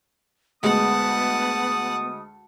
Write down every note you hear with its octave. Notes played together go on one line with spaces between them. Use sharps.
D2 G#3 B3 F#5 A5 D#6